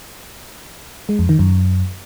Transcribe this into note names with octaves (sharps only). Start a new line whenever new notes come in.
G#3
F2
D#3
F#2